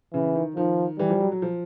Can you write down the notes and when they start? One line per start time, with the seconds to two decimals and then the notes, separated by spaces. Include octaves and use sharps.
0.14 C#3 E3
0.35 D#3
0.56 D#3 F3
0.99 E3 G3
1.10 F3
1.21 F#3
1.32 F#3
1.42 F3